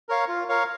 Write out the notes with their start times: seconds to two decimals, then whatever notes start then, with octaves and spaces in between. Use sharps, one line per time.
0.09 A#4 C#5 F5
0.28 F4
0.49 A#4 C#5 F5